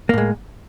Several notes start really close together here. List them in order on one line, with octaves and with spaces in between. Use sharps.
A#3 A2 G#3